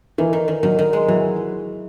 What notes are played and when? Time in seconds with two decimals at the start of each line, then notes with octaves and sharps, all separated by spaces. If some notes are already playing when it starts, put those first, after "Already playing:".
0.18 D#3 E3
0.33 D#3
0.48 D#3
0.63 D#3 F#3
0.79 D#3
0.93 G#3
1.08 E3 F#3